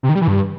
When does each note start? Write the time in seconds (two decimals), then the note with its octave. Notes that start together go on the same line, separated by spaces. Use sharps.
0.03 C3
0.09 D#3
0.15 G3
0.21 E3
0.28 G2